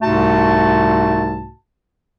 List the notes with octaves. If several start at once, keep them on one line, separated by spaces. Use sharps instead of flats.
C2 G#2 C3 A3 F#4 A5